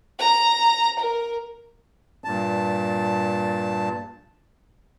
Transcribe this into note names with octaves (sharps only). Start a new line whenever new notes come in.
A#5
A#4
G2 A#2 A5